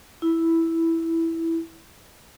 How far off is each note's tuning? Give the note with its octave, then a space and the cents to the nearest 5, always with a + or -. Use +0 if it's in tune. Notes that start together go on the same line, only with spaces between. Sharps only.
E4 -5